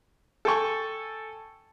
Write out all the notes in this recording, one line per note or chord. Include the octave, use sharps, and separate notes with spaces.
A4 G5 G#5 C#6